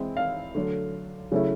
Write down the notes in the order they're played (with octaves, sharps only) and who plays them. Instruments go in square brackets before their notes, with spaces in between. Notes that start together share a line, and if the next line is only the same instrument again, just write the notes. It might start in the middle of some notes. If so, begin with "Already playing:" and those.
Already playing: [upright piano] E3 G#3 C4 E4
F5
D3 F#3 A3
C#3 F#3 A3 C#4 E4